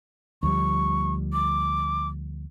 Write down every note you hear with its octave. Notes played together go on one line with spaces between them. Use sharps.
D2 F3 G3 C#6
D6